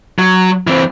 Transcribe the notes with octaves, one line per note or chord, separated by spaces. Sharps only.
F#3
E3 C4